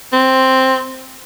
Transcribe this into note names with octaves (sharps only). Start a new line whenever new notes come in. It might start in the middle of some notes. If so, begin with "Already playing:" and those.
C4